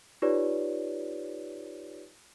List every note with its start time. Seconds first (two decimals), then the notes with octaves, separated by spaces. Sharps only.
0.22 D#4 F4 G4 B4 C#5 D5